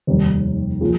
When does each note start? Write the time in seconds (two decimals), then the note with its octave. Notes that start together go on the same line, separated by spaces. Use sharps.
0.07 F1 D#2 D#3 G3 A#3
0.81 F3 A#3 F4 G#4